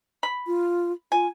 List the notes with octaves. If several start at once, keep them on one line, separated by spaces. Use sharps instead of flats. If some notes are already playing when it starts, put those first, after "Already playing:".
B5
F4
F4 G#5